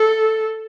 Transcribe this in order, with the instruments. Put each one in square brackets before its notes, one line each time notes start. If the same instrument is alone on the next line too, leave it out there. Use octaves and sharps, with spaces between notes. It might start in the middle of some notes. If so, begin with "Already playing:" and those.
Already playing: [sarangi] A4